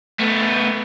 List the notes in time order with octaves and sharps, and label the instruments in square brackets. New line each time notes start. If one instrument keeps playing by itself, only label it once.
[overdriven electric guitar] A3 B3